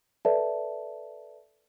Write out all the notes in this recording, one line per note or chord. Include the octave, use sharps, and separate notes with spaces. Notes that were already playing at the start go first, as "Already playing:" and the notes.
A4 B4 D5 E5 A5